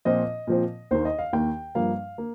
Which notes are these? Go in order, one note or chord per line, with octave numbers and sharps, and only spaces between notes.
A#2 F3 C4 D#5
A#2 F3 C4
D#2 D#3 A#3 C5
D#5
F5
D#2 D#3 A#3 G5
G2 F3 A#3 F5
A#3